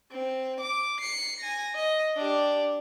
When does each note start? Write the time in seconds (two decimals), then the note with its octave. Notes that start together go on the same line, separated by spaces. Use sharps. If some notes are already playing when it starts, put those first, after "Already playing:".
0.12 C4
0.60 D6
1.01 C7 C#7
1.40 G#5 A#6
1.75 D#5
2.17 D4 G4